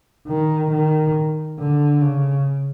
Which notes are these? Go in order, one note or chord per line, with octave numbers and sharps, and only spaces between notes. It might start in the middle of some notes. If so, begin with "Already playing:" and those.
D#3
D#3
D3
C#3